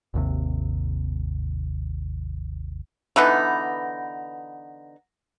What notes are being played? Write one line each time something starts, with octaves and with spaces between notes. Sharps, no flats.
G#1 D#2 C3
D3 E3 B3 D#4